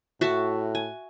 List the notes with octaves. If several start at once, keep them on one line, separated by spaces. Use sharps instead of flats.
A2 F#4 E5 A5
G#5